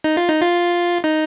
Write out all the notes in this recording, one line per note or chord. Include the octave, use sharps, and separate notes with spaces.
D#4
F4
D#4
F4
D#4